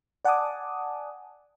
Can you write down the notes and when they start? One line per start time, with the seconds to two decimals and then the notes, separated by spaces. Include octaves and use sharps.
0.25 D5 F#5 G#5 A5 D6 D#6